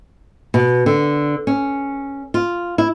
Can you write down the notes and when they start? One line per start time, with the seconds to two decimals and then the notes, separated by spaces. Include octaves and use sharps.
0.54 B2
0.86 D3
1.47 C#4
2.34 F4
2.78 E4